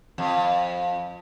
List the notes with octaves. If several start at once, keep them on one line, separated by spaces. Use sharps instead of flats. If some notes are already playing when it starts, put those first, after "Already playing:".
F2